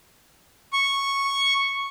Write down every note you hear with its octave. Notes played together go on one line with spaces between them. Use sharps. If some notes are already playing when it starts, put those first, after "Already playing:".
C#6